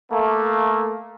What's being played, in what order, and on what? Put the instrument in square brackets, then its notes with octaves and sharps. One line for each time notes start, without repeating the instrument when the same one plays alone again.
[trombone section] A3 A#3